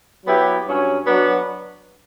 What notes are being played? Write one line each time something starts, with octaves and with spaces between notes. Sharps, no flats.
F#3 B3 E4 G4
G2 F#3 C#4
F#3 B3 D4 F#4